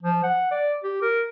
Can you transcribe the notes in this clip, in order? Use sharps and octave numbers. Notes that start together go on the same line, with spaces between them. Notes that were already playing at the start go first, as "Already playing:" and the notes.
F3
F#5
D5
G4
A#4